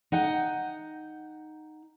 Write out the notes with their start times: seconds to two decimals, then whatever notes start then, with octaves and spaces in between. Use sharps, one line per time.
0.12 D#4 F#5 G5